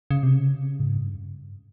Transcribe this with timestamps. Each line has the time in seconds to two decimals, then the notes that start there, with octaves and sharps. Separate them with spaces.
0.11 C#3
0.23 C3
0.35 C#3
0.80 G#2
0.97 G2